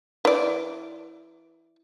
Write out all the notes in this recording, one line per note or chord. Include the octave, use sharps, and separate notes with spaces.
E3 D5